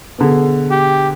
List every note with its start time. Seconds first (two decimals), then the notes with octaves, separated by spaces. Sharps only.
0.18 B2 D3 G#4
0.71 G4